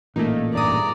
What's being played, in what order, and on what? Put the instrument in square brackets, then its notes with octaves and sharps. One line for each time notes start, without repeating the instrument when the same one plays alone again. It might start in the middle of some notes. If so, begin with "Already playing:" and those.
[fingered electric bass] A1 A#2 [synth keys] A3 A#3 D#4
[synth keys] E2 G2 D#6 [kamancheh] D5 A#5